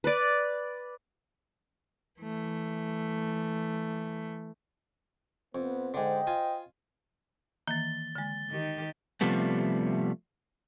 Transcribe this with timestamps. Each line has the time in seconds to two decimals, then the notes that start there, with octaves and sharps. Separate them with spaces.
0.04 B4 D5
2.20 E3 A3
5.55 F2 B3 C5
5.94 G#2 D3 C5 D#5 G5
6.27 F4 G#5
7.67 D#3 E3 A#3 A6 G7
8.15 D3 G#3
8.49 D#3 D#4 G4
9.21 C3 F3 G3 A3 B3